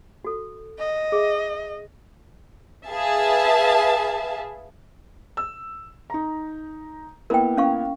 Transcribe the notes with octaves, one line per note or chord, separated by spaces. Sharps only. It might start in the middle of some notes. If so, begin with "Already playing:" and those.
F#4 A4
D#5
G#4 E5
G#4 B4 E5 F5 A5
E6
D#4 A#5
A#3 B3 E4 A#4 G5
C#4 F5 C#6